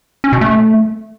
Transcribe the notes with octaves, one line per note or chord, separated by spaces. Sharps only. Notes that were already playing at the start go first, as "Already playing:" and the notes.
C#4
B2
A3